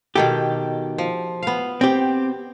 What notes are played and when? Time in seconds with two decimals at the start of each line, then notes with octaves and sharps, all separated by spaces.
0.15 B2 D#3 G4 A4
0.98 F3
1.43 B3 F5
1.81 C4 G4